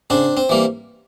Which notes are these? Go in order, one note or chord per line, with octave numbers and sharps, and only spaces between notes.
C#3 C4 D4
C4
E3 G3 A#3